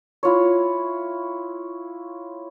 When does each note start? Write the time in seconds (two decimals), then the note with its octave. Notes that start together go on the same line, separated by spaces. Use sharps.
0.23 E4 F4 C#5